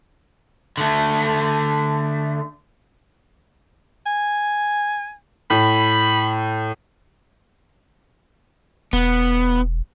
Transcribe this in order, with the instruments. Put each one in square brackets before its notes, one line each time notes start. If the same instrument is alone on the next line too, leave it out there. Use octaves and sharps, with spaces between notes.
[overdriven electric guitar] D3 A3
[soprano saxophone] G#5
[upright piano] A2 [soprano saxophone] B5
[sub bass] E1 [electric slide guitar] B3